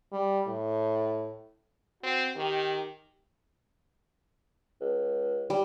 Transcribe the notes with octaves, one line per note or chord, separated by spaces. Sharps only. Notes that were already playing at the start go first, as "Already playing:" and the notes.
G3
A2
C4 F#4
D#3 G4
C#2
G3